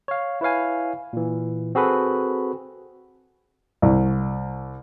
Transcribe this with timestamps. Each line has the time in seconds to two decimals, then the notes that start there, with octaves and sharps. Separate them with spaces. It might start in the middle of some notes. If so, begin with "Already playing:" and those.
0.08 C#5 F5
0.41 E4 B4 C#5 F5 G#5
1.13 A#2 E3
1.75 C4 F#4 G#4 A4 B4 B5
3.82 C2